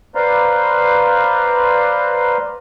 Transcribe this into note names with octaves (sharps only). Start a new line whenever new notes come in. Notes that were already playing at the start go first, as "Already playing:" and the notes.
B4 C5 D5 F5 A#5 C6